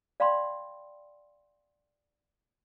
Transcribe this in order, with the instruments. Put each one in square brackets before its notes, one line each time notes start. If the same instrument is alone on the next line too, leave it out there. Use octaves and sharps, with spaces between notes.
[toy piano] D5 F5 G5 B5 C6